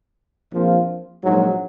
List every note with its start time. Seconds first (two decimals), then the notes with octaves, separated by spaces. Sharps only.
0.53 A#1 A#2 F3 C4 F4
1.23 A#1 G#2 F#3